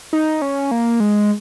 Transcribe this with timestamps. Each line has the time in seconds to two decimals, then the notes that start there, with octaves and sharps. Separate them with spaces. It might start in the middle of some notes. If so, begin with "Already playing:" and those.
0.13 D#4
0.42 C#4
0.71 A#3
1.00 G#3